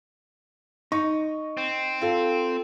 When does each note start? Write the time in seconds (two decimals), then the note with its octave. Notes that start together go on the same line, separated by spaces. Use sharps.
0.92 D#4 C#6
1.57 C4
2.01 F4 A4